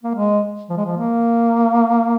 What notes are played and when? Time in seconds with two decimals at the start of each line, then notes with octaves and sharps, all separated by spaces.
0.03 A#3
0.15 G#3
0.70 F3
0.77 G#3
0.85 F3
0.98 A#3